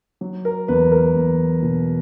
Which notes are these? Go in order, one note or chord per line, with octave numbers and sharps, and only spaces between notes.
F#3
A#4
E2 B4
A#4
E2
B2